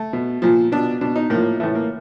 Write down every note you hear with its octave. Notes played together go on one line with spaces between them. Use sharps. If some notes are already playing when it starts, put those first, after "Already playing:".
Already playing: A3
B2
A#2 F3
B2 D4
B2 D4
D#4
A2 F3 A#3
A2 E3 A3
A#3